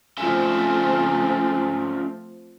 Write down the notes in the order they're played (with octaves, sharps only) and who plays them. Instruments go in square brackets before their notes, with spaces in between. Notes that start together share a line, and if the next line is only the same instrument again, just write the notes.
[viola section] F3 A3 C4 [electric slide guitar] C#4 F4 E5 [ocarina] G#5